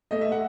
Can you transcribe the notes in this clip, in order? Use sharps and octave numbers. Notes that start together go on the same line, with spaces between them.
A3 D#5
E5
F#5